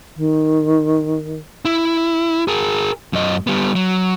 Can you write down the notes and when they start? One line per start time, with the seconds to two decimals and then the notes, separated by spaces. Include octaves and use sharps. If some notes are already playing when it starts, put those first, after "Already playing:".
0.16 D#3
1.65 E4
2.48 G#4 A#4
3.13 F#2 D#5
3.47 G3 B3
3.75 F#3